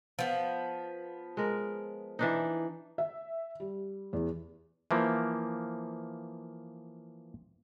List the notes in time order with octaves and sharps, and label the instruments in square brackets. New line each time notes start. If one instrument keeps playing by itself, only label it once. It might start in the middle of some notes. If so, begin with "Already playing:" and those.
[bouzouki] F3 B3
[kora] G#3 A#4
E3 D4 D#4
[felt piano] E5
G3
E2
[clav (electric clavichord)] E3 F3 A#3